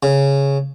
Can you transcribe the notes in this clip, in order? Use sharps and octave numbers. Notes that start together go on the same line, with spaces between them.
C#3